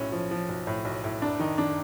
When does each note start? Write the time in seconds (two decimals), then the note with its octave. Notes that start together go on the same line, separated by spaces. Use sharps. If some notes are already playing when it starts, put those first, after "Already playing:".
Already playing: B1 A2 C#4
0.12 F3
0.31 F3
0.49 B1
0.67 A2
0.85 B1
1.04 A2
1.22 F#1 D4
1.39 D#3 D#4
1.58 D#3 D4